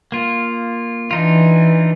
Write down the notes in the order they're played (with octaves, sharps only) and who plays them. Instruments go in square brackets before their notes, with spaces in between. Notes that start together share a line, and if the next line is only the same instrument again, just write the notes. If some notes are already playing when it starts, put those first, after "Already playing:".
[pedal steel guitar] A#3 F4
[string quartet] E3 [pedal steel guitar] D4 D#4 F4